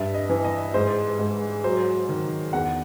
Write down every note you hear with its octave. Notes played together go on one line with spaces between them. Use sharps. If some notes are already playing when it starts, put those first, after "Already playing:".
Already playing: G2 E5
D#5
E3
D#5
G#2 C5
G#2
F#3 C5
D#3
E2 F#5